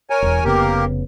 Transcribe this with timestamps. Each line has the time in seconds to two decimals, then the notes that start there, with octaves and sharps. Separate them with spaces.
0.10 A#4 C#5 G#5
0.22 E1 E2
0.44 F1 C#3 A#3 B3 G4 A#4